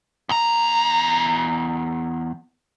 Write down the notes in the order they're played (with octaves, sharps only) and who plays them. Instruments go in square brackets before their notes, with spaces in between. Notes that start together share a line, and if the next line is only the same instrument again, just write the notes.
[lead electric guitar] E2 A#5